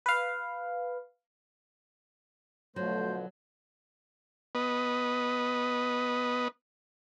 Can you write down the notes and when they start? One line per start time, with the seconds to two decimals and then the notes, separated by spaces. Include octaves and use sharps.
0.06 B4 F5
2.76 B2 D3 F3 F#3 A3 C5
4.55 B3 B4 D#5